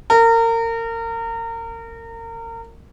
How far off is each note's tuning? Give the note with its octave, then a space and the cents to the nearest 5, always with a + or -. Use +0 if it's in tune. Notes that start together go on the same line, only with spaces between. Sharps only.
A#4 -30